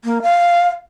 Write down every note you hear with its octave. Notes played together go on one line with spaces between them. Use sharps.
A#3
F5